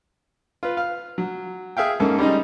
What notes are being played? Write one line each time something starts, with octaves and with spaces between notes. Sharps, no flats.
F4 B4
F5
F#3
G#4 E5 F5 G5
G#2 A#3 C#4 A4
G3 G#3 C#4 D#4